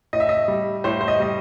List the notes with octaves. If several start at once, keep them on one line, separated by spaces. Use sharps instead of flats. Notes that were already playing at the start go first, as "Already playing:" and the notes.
A2 D#5
E5
D#5
G3
A2 C5
C5
D#5
G3 D#5